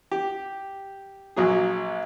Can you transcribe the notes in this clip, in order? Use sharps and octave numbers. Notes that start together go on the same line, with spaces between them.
G4
A#1 F#3 G#4